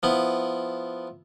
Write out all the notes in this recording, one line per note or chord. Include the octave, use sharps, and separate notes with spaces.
F3 B3 E4